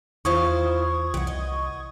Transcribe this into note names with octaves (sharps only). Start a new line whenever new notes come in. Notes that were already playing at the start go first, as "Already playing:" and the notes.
E2 E4 F4 C5 C#6 D#6 G#6
C2 E3 F#5
D#5